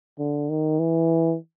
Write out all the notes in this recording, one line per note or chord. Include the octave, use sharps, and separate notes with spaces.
D3
D#3
E3